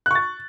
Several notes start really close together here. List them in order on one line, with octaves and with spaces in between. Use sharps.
F#6 C#6 A6